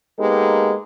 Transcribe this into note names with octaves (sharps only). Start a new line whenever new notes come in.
G#3 A#3 B3 D#4 G4 A4